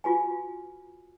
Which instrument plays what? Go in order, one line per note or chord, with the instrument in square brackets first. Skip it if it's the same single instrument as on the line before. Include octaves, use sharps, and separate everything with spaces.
[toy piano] F4 F#4 B4 G#5